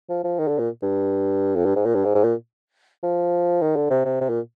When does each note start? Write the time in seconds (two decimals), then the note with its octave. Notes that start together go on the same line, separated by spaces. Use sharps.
0.09 F3
0.24 F3
0.39 D#3
0.47 D3
0.58 A#2
0.82 G2
1.56 F2
1.65 G2
1.76 G#2
1.85 A#2
1.95 G2
2.05 G#2
2.15 G#2
2.24 A#2
3.03 F3
3.62 D#3
3.76 D3
3.90 C3
4.05 C3
4.21 C3
4.29 A#2